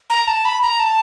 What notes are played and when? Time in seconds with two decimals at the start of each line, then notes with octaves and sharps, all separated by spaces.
0.10 A#5
0.27 A5
0.45 B5
0.62 A#5
0.80 A5